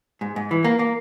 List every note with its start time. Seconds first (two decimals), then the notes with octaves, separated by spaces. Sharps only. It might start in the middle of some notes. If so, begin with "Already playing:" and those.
0.21 G#2
0.36 G#2
0.51 E3
0.64 A#3
0.79 A#3